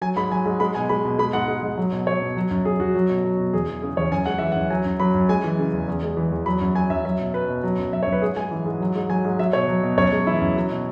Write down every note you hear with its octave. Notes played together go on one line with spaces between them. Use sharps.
F#3 G#5
G#2 B5
F#3 G#5
G#2
G#3 B5
B2 G#5
G#3 B5
B2
G#3 B5
G#2 F#5
G#3
G#2
F#3
B2
F#3 C#5
B2
F#3
F#2
F#3 G#4
F#2 F#4
F#3
B2
F#3
B2
E2 G#4
E3
C#3 G#4
E2 C#5
F#2 G#5
G#3 F#5
E3 E5
F#5
F#2
F#3 G#5
F#2
F#3 B5
F#2
G#3 G#5
E3
C#3
E2
E2
G#3
E3
E2
F#3 B5
F#2
F#3 G#5
F#2 E5
F#3 E5
B2
F#3 B4
B2
F#3
F#2
F#3 E5
F#2 C#5
B4
G#2 G#4
G#3 G#5
E3
G#2
F#3
G#2
F#3 G#5
G#2
F#3 E5
B2 C#5
F#3
B2
F#2 C#5
G#3
E3 E4
F#2
F#3
B2